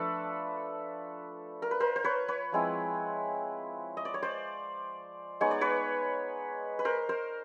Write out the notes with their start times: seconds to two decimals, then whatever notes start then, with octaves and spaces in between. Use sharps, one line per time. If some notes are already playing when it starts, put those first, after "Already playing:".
Already playing: F3 A3 D4 A4 B4
1.62 A#4
1.71 B4
1.80 A#4 C5
1.96 C5
2.04 B4 C#5
2.28 B4 C#5
2.52 F3 G#3 C4 E4
3.97 D#5
4.05 D5
4.14 C#5
4.23 C5 D5
5.41 G#3 B3 D#4 C#5
5.51 D5
5.61 B4 C#5
6.79 B4
6.85 A#4 C5
7.09 A#4 C5